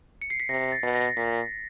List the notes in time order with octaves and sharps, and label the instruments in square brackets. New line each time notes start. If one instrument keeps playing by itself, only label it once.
[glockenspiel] C#7
C7
B6
[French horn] C3 [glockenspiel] A#6
[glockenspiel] A6
[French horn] B2
[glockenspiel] A#6
[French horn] A#2 [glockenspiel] B6